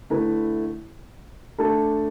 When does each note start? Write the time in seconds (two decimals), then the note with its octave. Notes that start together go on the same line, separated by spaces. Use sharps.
0.10 D3 A3 E4 B4
1.59 A3 D4 A4